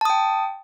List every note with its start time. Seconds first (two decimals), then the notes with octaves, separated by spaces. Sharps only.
0.01 A5
0.05 D#6
0.10 G5